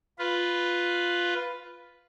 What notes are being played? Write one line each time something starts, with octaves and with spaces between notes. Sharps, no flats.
F4 B4